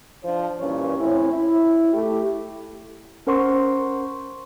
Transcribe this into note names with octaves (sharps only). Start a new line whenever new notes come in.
F3 D4 C5
G2 A#2 E3 C#4 C#5
A2 C4 C#4 E4
E4
A3 G4
C#4 A#4 C5 F#5 C6 C#6